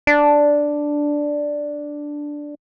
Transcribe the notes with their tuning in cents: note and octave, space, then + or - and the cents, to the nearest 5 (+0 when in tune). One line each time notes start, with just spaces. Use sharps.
D4 +0